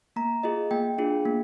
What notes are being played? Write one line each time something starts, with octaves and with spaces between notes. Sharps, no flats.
A#3 A#5
F4 G#4 D#5
A#3 G5
D4 F4 G#4
A#3